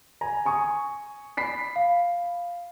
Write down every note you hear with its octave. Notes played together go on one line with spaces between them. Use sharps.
G#5 A#5
G#5 C#6 D#6
B5 B6 C7
F5